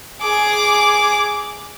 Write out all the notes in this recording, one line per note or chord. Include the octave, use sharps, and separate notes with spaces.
G#4 D6